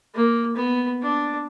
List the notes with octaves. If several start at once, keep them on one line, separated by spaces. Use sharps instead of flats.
A#3
B3
D4